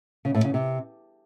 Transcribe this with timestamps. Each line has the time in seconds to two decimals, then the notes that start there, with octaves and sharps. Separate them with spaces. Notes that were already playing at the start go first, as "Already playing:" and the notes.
0.25 C#3
0.35 A2
0.44 C#3
0.54 C3